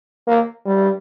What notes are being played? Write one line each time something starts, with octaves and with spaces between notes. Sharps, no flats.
A#3
G3